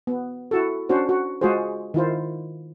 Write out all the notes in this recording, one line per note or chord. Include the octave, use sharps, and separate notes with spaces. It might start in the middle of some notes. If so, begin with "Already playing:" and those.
B3
E4 F#4 A4
C#4 D4 F#4 C5
F#4
G#3 F4 F#4 G#4 C5
D#3 E4 F4 C5